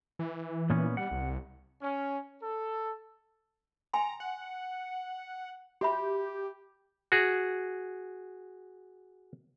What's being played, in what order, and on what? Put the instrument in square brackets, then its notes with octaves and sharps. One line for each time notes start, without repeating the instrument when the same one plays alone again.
[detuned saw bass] E3
[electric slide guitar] A#2 B3 C#4
[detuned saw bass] G3 [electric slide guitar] F#5
[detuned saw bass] C2
[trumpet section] C#4
A4
[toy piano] G5 G#5 C6 [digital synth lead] A#5
[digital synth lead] F#5
[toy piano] F#4 E5 B5 [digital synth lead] G4
[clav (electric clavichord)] F#4 G#4